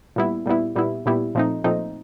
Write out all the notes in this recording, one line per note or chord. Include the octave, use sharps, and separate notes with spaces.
A#2 G3 B3 E4
A#2 G3 B3 E4
A#2 G3 B3 E4
A#2 G3 B3 E4
A#2 F3 A3 C4 D#4
A#2 F3 A3 C4 D#4